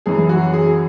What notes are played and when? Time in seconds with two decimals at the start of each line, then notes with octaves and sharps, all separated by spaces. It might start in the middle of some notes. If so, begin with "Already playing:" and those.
0.06 F#2 E3 G#4
0.29 F#4
0.53 G#4